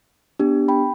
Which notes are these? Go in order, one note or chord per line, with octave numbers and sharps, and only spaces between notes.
B3 D4 G4
G5 B5